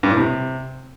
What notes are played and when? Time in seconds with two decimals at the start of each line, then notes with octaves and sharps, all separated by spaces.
0.03 G2
0.10 A2
0.17 C3